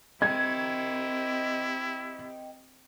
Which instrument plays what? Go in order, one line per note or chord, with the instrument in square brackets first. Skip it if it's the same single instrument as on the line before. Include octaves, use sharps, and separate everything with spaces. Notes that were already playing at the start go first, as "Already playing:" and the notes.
[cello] C4 G4 [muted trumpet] E4 [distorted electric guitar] D#5 G5 [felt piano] G#6